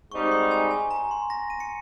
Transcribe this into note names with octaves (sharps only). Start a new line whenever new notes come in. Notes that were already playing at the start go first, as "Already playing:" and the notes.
G#2 G3 C4 D#4 C#6
C6
G#5
G#5
A#5
C6
A#6
D#7
C#7